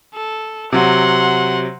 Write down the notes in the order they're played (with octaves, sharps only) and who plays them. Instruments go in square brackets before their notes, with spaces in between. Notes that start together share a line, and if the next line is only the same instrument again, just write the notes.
[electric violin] A4
[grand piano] C3 F#3 [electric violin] F#5 C6